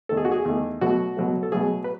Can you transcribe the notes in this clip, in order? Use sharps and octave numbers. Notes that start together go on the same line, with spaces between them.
E2 D#3 A3 A4
G#4
F#4
G#4
E2 D#3 A3
B2 F#3 A3 F#4
B2 F#3 A3
A4
B2 F#3 A3 G#4
B4